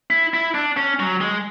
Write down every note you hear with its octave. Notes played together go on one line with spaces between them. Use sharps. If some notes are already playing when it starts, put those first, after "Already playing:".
E4
E4
D4
C#4
F#3
G#3